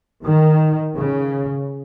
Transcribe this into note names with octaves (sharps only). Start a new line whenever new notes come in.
D#3
C#3